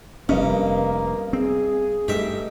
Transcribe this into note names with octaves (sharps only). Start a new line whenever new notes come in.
F1 G2 A#3 B3 C#4 D#5
C4 G#4
G2 A3 D#4 G4 E5